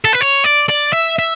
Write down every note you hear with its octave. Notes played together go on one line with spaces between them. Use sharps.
A4
B4
C#5
D5
D5
E5
E5